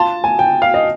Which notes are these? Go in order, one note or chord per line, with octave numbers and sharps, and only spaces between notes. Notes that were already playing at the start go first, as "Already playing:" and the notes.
Already playing: F4 A5
G#5
G5
F5
D#5